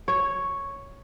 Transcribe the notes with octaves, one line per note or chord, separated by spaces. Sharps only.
C#5